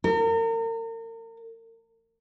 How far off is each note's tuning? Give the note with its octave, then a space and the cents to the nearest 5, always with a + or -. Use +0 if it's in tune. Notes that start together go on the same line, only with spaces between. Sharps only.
A#4 -40